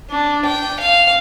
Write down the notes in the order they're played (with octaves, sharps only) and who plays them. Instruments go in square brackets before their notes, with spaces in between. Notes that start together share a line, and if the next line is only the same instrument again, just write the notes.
[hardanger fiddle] D4
G5
F5